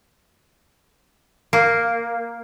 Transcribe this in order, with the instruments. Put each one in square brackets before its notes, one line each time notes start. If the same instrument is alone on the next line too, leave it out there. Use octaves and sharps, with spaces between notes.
[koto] A#3